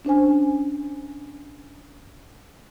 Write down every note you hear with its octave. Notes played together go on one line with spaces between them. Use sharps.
C#4 D4 C5 G#5